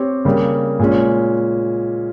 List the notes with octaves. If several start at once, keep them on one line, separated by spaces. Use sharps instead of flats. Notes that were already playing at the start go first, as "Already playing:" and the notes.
Already playing: C4 G4 C#5
C#3 G3 A#3
A#2 G#3 C#4